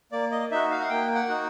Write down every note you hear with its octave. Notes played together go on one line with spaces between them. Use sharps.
A#3 D5
D#5
D#4 F#4 E5
F5
F#5
A#3 G5
F#5
D#4 F#4